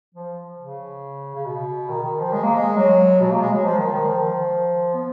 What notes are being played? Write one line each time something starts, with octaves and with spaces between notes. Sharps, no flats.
F3
C#3
C#3
B2
D#3
D#3
F3
G#3
A#3
G#3
F#3
B2
A#3
G#3
F#3
F3
D#3
D#3
F3
B3